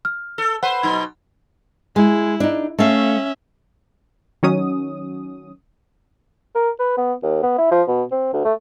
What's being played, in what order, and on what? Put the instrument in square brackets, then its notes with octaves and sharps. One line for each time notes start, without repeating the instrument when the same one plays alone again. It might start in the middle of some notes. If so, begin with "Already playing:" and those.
[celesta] F6
[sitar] A4
[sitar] B4 C5 [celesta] F#5
[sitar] B2 F#3 D#4
[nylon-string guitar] G#3 [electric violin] E4
[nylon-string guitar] D4 D#4
[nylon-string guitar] A3 F5 [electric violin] C#4 E5
[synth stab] D#3 F#3 C#4 D#6
[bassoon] A#4
B4
B3
D#2
B3
E4
F3
B2
C4
D2
A3